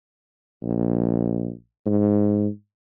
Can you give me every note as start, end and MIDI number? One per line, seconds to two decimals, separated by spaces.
0.62 1.50 34
1.86 2.47 44